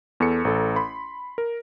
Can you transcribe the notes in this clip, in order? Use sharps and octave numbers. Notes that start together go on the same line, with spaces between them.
E2 A4 C#7
A1 A4
B5 C6
A#4